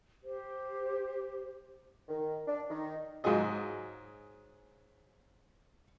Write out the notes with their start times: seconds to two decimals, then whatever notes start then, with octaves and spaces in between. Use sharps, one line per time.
0.23 G4 C5
2.08 D#3
2.47 D4
2.70 D#3
3.24 G#2 F#3 F4 G#4 D#5